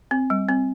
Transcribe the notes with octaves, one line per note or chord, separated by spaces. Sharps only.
C4
G3
C4